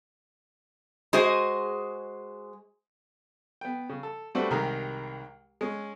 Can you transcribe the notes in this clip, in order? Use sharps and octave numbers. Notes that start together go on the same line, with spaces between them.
G#3 F#4 G#4 C5 D#5
B3 G5
C#3
A4
G3 A3 C4 D4 F#4 B4
C2 D#3 G#3 G4 A#4 A#5
G#3 C#4